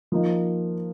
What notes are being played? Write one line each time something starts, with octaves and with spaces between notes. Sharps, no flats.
F3 A#3 D#4